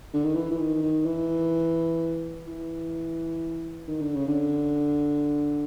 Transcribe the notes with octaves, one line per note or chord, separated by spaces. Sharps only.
D3
D#3
E3
E3
D#3
D#3
E3
E3
D#3
D3
C#3
D3